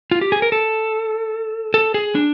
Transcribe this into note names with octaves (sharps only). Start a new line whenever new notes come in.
F4
G4
G#4
A#4
A4
A4
G#4
D4